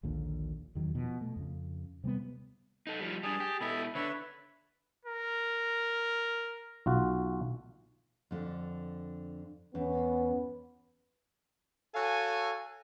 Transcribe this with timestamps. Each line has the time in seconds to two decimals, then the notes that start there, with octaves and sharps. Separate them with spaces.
0.03 A#1 D#2 A#2 D3
0.75 E2 D#3 F#3
0.95 B2 F3
1.21 A3
1.36 F2 C#3
2.04 C3 G3 A#3 B3
2.87 D#4 A4
3.00 F3 G3
3.23 G3 D4 G#4 A5
3.40 G4
3.61 B2 E4 A4 D#5 B5
3.95 D3 D4 B4 C#5 E5
5.05 A#4
6.86 B1 F4 F#4
8.31 F2 D3
9.75 E2 B3 C#4
11.94 F#4 A4 C#5 F5 G#5